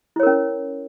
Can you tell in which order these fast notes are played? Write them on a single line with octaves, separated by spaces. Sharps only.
E4 C#5 A#4 C#4